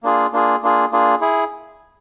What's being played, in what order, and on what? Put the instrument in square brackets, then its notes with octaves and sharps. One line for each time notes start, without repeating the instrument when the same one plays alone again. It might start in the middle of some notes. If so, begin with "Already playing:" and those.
[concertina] A#3 D4 F4 G#4
A#3 D4 F4 G#4
A#3 D4 F4 G#4
A#3 D4 F4 G#4
E4 G#4